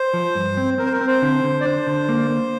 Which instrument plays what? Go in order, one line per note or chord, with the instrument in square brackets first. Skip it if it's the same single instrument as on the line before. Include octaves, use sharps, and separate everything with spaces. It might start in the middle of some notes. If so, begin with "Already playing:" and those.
Already playing: [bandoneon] C5
[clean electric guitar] F3
G2
C4
[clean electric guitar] C4 [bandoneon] A#4
[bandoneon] C5
A#4
[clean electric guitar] C4
[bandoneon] C5
[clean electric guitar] D3
D3
[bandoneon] D5
[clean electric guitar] D4 [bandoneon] C5
[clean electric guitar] D3
A#3
A#3